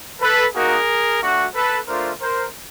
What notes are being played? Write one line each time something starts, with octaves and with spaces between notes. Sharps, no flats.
A4 B4
A#3 D#4 F#4 G#4 A#4
A3 D4 F#4
A4 B4
A3 D4 F4 A#4 C5
A#4 C5